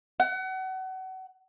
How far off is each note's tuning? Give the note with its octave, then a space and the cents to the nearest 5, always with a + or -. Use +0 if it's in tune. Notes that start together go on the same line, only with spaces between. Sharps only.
F#5 +30